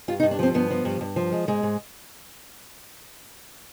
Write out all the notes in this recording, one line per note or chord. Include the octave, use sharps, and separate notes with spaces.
G2 F4
D#4
G2
D4
F3 C4
G2 B3
F3
G2
G2
F3
G#3
G#2 G#3
G#2